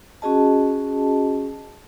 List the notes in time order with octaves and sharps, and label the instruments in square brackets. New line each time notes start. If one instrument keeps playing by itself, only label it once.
[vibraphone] C#4 F#4 G#4 D#5 A5